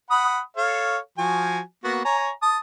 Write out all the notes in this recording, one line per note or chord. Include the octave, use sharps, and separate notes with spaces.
F#5 B5 D#6
A4 C#5 F5
F3 F#4 G#5
A#3 B3 F#4
C#5 G#5 A#5
A5 D#6